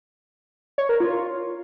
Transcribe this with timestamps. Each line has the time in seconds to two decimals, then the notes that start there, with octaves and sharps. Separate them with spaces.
0.78 C#5
0.89 A#4
1.00 F4